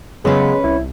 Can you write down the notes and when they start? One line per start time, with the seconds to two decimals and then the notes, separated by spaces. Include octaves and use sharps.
0.25 C#3 F#3 G#3 B3 C#4 B4
0.64 C2 E4